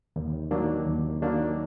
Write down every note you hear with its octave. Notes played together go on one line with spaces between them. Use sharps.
D#2
D#3 F#3 A#3 D4
D#2
D#3 F#3 A#3 D4